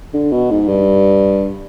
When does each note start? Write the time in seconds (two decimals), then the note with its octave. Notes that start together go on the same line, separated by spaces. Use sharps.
0.14 D3
0.32 B2
0.51 G#2
0.68 G2